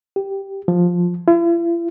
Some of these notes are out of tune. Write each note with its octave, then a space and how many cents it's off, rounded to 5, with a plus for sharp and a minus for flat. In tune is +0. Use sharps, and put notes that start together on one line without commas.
G4 +0
F3 +10
E4 +45